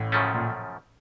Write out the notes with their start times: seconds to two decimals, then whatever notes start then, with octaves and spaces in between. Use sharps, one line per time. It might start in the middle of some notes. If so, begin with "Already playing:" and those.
Already playing: A1 A2
0.12 F#2 C#3 F3 A3 C#4
0.34 A#2